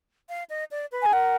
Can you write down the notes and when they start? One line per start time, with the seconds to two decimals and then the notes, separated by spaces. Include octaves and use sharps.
0.29 F5
0.50 D#5
0.71 D5
0.92 B4
1.03 G#4 G#5
1.13 A#4 F#5